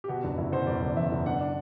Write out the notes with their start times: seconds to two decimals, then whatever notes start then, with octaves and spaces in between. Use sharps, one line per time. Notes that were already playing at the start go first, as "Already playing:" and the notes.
0.04 G4
0.08 B2 F#4
0.24 F#1 D4
0.38 F#1 E4
0.52 B2 C5
0.67 F#1 D5
0.82 F#1
0.88 D5
0.96 E2 E5
1.11 F#1
1.26 D4 F#5
1.41 D4